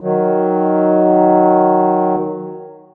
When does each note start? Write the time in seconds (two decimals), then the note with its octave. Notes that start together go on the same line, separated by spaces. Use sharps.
0.01 D#3 F#3